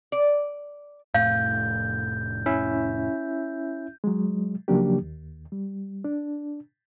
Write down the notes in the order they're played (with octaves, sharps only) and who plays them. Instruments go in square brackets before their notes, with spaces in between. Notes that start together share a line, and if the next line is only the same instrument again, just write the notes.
[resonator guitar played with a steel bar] D5
[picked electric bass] F1 A2 A3 [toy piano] F5 [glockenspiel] G6
[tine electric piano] C#4 E4 E5
[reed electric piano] F#3 G#3
C#3 F3 F#3 A#3 D4 G4
D#2
G3
D4